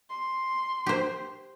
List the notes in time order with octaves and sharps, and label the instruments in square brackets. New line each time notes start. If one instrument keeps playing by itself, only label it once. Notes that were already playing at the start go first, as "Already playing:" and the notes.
[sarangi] C6
[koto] G4 C5